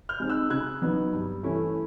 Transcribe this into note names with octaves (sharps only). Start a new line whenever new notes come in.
F6 G6
G#3 C4 D#4
E6 F#6
C#3 F#6 G#6
F#3 B3 D#4
G2
E3 A3 C#4 E4